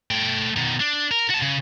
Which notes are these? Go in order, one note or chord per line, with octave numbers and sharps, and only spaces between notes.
A3 G5
B2 D#3
D4
A#4
F#4 A5
C#3